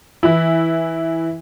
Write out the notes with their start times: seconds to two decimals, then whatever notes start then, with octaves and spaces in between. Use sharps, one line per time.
0.23 E3 E4